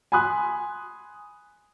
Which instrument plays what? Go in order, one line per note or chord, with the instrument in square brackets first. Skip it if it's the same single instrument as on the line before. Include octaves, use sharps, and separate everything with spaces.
[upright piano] G#5 B5 C6 D#6 F#6